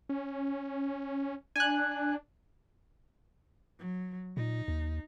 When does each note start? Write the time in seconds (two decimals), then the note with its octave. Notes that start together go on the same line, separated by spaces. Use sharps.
0.09 C#4
1.56 D4 G#5 F#6
3.79 F#3
4.37 A#2 D#4
4.68 D#2